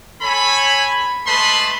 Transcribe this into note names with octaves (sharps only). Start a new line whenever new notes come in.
A4 C#5 G#5 B5
G#3 A3 B4 A5 B5 C6